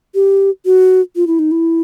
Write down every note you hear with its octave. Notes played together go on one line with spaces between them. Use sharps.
G4
F#4
F4
E4
D#4
E4